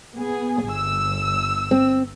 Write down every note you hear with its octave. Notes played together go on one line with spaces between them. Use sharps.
B3 G#4
G1 E6
C4